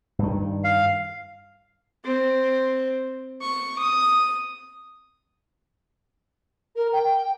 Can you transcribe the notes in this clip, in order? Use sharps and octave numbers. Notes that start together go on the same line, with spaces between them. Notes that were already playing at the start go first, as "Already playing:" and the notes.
G2 D#3
F5
C4
C#6
D#6
A#4
G5